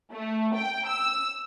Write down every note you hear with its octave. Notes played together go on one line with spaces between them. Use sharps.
A3
G5
E6